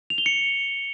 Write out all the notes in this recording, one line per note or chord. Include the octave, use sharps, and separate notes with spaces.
F7
G7
C#7